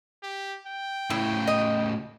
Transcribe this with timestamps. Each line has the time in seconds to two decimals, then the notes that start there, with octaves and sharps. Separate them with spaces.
0.23 G4
0.67 G5
1.10 A2 C#3 E4
1.47 D#5